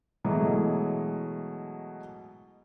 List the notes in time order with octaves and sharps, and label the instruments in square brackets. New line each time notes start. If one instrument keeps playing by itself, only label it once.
[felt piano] B2 E3 F#3 G#3 A3